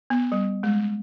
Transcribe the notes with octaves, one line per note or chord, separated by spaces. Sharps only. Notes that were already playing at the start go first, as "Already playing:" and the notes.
B3
G3
G#3